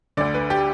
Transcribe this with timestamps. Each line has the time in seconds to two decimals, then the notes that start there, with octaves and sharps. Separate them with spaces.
0.17 D2 D3 D5
0.34 B4
0.50 G4